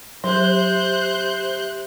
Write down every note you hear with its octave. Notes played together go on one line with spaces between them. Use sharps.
F#3 G4 C5 E5 F#6 G6